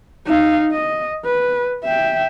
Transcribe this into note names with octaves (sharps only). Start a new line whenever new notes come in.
D#4 F5
D#5
B4
E5 G5